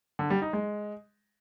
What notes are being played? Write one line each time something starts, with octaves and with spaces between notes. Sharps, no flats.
D3
G3
D#4
G#3